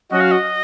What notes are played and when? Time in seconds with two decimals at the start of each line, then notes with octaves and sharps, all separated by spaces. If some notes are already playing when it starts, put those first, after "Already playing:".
0.10 F#3 C#4 F#4 D#5
0.21 F5
0.31 D#5